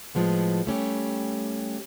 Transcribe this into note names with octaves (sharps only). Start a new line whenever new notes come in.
A2 F3 G#3 B3
G3 A3 C#4 G4